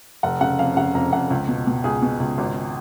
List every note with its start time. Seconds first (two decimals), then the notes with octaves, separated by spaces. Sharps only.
0.23 F1 F#5
0.41 C#3 F#5
0.59 F2 F5
0.77 C#3 F#5
0.95 F2 A#5
1.12 F2 F#5
1.30 C#2
1.48 B2
1.67 B2
1.84 C#2 G#4
2.02 B2
2.20 C#2
2.38 G#1